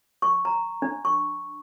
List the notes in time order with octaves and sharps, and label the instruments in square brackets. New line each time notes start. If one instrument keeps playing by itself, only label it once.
[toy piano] C#6
A#5
D4
C#6